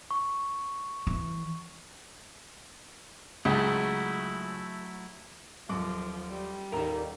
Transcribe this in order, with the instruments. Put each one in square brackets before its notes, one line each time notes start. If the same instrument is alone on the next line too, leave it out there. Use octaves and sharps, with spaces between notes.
[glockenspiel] C#6
[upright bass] E3
[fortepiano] C#2 [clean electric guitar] F#3 A3 E4
[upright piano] D#1 F#2 D6 [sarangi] F3
[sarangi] G3
[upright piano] D#1 [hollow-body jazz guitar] D#4 A#4